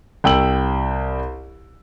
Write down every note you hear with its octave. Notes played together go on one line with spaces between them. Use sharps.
C2 G5 E6 F#7